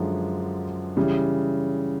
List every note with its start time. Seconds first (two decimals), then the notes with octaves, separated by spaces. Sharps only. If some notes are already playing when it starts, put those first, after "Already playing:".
Already playing: F#2 D3 F3 G#3
0.97 C#3 E3 G3